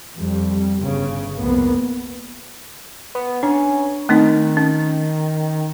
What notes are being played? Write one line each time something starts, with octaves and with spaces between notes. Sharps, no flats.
F2 G3
G1 C#3
C2 F2 A#3 B3
B3
C#4 D4
D#3 A3 C4 D#4
C#4